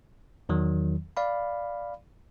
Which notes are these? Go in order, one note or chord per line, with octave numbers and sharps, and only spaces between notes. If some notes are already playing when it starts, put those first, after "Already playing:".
E2 D#3 F#3
D5 F5 B5